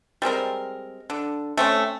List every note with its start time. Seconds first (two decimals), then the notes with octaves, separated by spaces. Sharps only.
0.22 G3 G#3 C4 A#4
1.10 D3
1.57 A3 C4 C#4